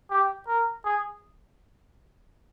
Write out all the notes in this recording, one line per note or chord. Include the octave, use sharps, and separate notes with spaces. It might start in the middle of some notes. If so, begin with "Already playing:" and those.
G4
A#4
G#4